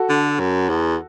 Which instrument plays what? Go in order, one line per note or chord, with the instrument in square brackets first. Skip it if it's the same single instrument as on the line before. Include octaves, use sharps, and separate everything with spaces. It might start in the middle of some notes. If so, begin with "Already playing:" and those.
Already playing: [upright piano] F#4 A4
[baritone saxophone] D3
F#2
E2